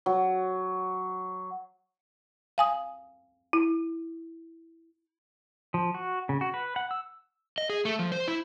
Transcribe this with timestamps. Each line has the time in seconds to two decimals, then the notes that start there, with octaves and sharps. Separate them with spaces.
0.06 F#3
2.58 F5 G#5 D#6
3.53 E4
5.74 F3
5.94 F#4
6.29 C#3
6.41 F#4
6.54 B4
6.76 F#5
6.91 E6
7.58 D#5
7.70 G#4
7.85 A3
7.99 F3
8.12 C5
8.28 E4